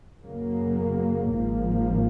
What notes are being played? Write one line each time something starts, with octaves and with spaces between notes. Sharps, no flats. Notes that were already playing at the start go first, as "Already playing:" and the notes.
F#2 C#3 F#3 A#3
G#1 G#2 F3 A#3